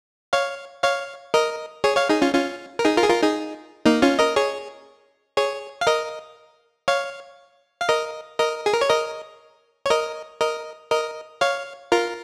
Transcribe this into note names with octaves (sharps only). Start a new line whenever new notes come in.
C#5 F5
C#5 F5
A#4 D#5
G#4 C#5
C#5 F5
D#4 G#4
C#4 F4
C#4 F4
A#4
D#4 G#4
F4 A#4
G#4
F4 A#4
D#4 G#4
A#3 D#4
C#4 F4
A#4 D#5
G#4 C#5
G#4 C#5
F5
A#4 D#5
C#5 F5
F5
A#4 D#5
A#4 D#5
G#4
A#4
C#5
A#4 D#5
C#5
A#4 D#5
A#4 D#5
A#4 D#5
C#5 F5
F4 A#4